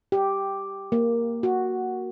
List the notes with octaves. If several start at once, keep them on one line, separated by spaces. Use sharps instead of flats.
G4
A#3
F#4